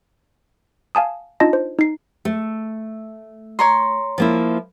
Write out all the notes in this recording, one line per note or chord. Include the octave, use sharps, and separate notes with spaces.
F5 G#5 A5 D#6
D4 D#4 F4 D#5 A5 A#6
C5
D#4 C7
A3
C#5 A#5 C6
F3 A#3 E4